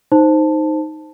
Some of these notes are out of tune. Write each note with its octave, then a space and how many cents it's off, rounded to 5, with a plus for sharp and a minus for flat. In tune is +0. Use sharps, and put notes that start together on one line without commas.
D#4 +0 C5 +0 A5 +0